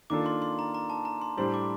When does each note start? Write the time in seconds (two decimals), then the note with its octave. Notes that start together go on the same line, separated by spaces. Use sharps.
0.10 D#3 A#3 D4 F4 A4 D6
0.26 C6
0.42 C6
0.59 A#5
0.74 A#5
0.90 A5
1.05 A#5
1.21 C6
1.37 A2 G3 D4 G4 C5 C6
1.54 D6